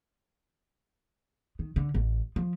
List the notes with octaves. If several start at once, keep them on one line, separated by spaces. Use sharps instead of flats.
D#3
D3
A1
F3